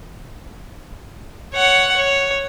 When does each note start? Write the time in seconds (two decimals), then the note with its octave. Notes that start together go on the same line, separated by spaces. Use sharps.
1.54 C#5 F#5
1.97 C#5